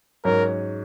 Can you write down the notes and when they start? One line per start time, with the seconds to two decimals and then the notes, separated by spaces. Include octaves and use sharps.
0.24 G#2 F#3 C#4 A#4